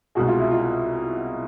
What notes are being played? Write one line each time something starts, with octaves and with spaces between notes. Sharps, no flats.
C2 B2 G#3 F#4
F4
E4
F4